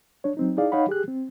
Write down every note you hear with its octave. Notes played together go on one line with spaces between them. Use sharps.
D4 C#5
F#3 C4 D#4
D#4 E4 G#4 D5 F5
D#4 C#5 D#5 F5 F#5 B5
G4 G#4 F#6
C4